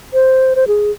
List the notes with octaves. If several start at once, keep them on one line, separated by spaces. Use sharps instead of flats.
C5
C5
G#4